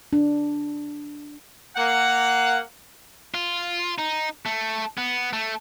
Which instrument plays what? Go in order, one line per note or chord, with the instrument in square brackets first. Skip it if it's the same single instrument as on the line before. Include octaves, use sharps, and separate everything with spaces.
[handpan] D4
[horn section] A#3 F#5
[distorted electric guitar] F4
D#4
A3
B3
A3